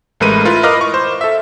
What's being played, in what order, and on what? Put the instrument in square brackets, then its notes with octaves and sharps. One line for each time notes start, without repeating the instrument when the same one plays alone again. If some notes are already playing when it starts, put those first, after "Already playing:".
[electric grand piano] A1 G#3 A3 A#4 B4 D#7
E4 F4 A#4 B4
A#4 B4 D#5 F5 D6 F6
C#6
C5
A4 E5